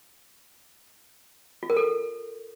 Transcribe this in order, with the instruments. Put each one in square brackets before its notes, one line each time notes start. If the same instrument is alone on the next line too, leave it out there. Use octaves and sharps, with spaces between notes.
[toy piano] F4
A#4
A4